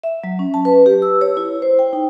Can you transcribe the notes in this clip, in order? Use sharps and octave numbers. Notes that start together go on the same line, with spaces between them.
E5
F#3
C#4
A5
B4
G4
E6
C#5
E4
C5
G5
D#4